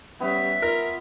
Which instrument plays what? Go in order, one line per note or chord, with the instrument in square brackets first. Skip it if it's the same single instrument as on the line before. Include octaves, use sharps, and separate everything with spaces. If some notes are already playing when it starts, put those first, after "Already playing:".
[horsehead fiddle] G3 C#4 [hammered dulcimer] B3 [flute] E5
[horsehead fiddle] F4 [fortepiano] A#4